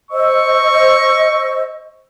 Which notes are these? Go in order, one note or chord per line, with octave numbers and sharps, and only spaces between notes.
C5 D#5 C#6 E6